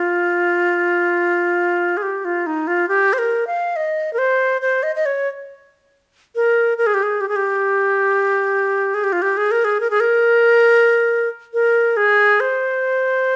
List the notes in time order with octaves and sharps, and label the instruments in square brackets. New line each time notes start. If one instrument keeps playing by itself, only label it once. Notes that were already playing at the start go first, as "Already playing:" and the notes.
Already playing: [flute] F4
G#4
G4
F4
D#4
F4
G4
C5
A#4
F5
D#5
A#4
C5
C5
D#5
D#5
C#5
A#4
A#4
G#4
G4
G#4
G4
G#4
G4
G#4
G4
F4
G4
G#4
A#4
G#4
A#4
G#4
A#4
A#4
G#4
C5